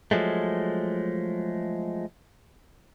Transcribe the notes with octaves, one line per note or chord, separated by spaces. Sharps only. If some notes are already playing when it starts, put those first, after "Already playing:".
F3 F#3 G#3 A3